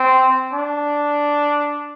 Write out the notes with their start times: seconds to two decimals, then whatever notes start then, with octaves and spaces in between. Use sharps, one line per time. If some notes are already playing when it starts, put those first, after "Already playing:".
Already playing: C4
0.53 D4